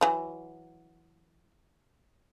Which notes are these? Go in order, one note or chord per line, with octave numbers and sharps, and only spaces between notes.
E3 F#3